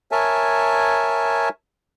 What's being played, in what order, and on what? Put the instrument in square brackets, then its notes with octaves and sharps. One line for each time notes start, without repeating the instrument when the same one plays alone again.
[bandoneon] A#4 C#5 E5 G#5 A5